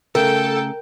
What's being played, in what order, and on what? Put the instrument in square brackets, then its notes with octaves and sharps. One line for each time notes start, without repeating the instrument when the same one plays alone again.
[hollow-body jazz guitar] C#3 A3 [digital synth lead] A4 [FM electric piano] A#4 [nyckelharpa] G5